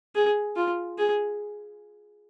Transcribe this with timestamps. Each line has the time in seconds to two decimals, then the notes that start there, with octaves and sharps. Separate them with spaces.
0.16 G#4
0.57 F4
0.99 G#4